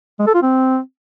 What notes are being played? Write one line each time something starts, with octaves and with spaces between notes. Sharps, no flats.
G#3
A4
F4
C4